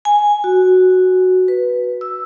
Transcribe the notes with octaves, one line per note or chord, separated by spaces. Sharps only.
G#5
F#4
B4
E6